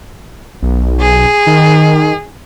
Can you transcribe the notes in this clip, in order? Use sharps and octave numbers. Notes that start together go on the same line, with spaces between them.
B1
G#4
D#3